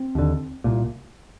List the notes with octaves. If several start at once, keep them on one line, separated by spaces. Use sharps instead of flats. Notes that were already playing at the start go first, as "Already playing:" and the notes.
Already playing: C4
D#2 D3
C2 A#2